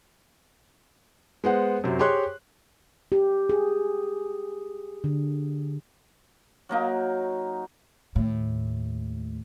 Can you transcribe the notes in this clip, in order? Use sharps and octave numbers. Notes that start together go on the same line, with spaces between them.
G#3 B3 C5 F#5
F#2 C3 F#3 C5
G4 G#4 C5 C#5 C6 F#6
G4
G#4
D3
F#3 A#3 D#4
D#2 A2